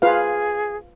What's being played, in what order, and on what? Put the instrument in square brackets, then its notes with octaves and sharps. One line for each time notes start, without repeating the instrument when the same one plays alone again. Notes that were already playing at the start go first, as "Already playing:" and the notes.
[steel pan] F4 B4 F5 [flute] G#4